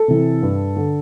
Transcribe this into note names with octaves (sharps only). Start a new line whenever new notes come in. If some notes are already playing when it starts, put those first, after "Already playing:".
Already playing: A4
C3 E3
G2
D3